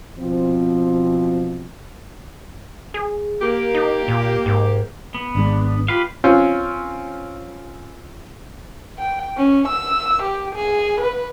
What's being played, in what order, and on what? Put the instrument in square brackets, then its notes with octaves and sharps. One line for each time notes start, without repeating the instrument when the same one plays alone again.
[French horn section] B2 F3 C4
[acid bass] G#4
[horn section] A#3 G4
[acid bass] D#4
A#2
G#2
[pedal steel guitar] B3
[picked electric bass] G#1 G#3 [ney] D4
[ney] F4 [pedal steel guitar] G4 B4 F5
[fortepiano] C4 C#4 F4
[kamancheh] G5
C#4
E6
G4
G#4
B4